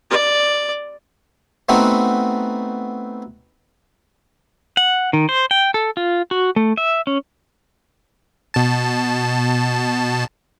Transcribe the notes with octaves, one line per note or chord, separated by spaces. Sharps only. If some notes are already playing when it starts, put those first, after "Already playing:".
D5
A3 B3 C4 D#4 F#4
F#5
D#3
C5
G5
A4
F4
F#4
A3
E5
C#4
B2 A5